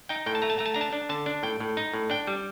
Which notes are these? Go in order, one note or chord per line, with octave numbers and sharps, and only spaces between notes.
D#4 G5
A2 G5
A5
A3 A#5
A5
A3 A#5
A5
D4 A#5
A5
D4
D3 A5
D4
A2 G5
A2
D#4
A2
D4 G5
G3